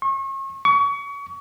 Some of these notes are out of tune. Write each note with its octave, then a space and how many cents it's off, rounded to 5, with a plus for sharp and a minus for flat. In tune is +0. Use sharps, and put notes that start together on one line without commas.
C#6 -40
C#6 +30